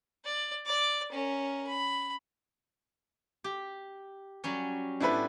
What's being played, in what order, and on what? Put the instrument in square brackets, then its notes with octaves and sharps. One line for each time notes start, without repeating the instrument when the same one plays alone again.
[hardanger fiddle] D5
D5 D6
C#4 A#4
B5
[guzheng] G4
F#3 G3 C#4
[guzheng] A2 G3 B3 [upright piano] D4 E4 B4